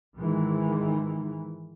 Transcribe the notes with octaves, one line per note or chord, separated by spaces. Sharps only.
G#2 D#3 E3 G#3